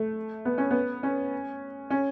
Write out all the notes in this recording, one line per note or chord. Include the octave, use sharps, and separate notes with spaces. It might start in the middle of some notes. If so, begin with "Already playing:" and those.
Already playing: A3
B3
C#4
B3
C#4
C#4